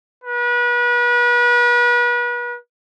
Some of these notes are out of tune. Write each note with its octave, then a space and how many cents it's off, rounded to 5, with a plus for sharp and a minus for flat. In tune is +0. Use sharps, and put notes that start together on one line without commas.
B4 -35